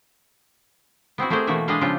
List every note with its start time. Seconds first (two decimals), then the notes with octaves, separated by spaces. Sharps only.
1.18 B3 C4 E4 F#4
1.30 A3 C4 G4 G#4 A#4 C5
1.47 B2 E3 A3 A#3 F#4 E5
1.68 G#3 D4 B4 D#5 F5 G5
1.81 C#3 F3 C4 D4 F4 G4